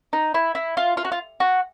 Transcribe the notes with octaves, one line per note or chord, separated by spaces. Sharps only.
D#4
E4
E4
F4
F4
F#4
F4
F#4